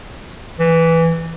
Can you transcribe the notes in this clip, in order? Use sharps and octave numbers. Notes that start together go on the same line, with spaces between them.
E3